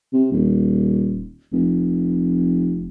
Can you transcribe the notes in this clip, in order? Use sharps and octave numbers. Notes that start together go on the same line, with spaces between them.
C3
D#1
F1